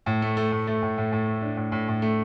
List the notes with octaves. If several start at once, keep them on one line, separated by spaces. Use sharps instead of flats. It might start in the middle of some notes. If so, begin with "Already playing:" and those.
A2
A3
A3
A2
A3
A2
A2
A2
A3
D4
A2
A2
A2
A3